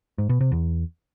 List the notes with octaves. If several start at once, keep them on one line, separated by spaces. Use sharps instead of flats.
G#2
B2
C3
E2